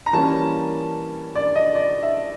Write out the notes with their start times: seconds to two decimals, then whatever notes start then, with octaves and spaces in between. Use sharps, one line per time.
0.06 A#5
0.13 E3 G3 A#3 C#4 A5
1.35 D5
1.55 D#5
1.75 D5
2.03 E5